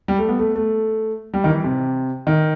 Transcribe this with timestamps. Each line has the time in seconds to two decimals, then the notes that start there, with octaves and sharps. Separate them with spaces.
0.08 G3
0.19 A3
0.29 B3
0.39 A3
0.56 A3
1.34 G3
1.44 D#3
1.48 E3
1.64 C3
2.27 D#3